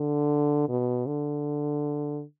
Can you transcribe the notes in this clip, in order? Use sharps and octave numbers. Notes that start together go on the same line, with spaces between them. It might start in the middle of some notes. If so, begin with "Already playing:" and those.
Already playing: D3
B2
D3